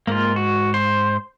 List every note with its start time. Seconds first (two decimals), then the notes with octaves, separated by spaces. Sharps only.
0.07 G#2 A#3 F4
0.36 F#4
0.74 C5